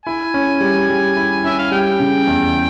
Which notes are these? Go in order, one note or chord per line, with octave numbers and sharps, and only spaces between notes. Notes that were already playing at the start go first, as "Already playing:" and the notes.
E4 G#5
C#4
G3
G3
E4
C#4 E5
F5
G3 G5
C#3
E2